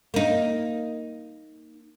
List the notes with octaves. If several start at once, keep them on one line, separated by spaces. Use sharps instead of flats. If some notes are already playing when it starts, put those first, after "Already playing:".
A#3 D#4